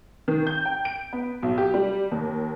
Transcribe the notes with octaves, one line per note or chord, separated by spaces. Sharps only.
D#3
G6
G5
D7
B3
B1
G4
G3
D#2